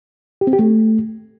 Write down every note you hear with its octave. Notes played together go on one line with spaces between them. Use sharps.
G4
C4
G4
A3